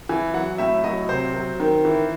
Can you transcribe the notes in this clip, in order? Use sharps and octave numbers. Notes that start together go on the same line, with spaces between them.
E3 G#5
F#3 F#5
A2 E5
F#3 D#5
C3 C5
F#3
D#3
E3